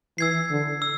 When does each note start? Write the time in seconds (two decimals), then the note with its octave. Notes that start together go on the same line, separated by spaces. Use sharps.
0.18 E3 E6 G#6 C7
0.51 D3
0.82 E6